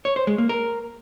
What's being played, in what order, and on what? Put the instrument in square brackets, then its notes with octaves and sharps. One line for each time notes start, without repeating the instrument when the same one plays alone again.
[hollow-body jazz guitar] C#5
C5
G#3
A#3
A#4